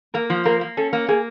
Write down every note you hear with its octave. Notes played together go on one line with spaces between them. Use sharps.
A#3 A#4
F3
A#3 A#4
A#3
C#4 A4
A#3
A#3 G#4